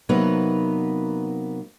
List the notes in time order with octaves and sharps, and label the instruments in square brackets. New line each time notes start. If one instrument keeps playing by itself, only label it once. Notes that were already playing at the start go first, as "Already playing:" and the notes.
[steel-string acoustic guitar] C3 F#3 A#3 B3 D#4 B4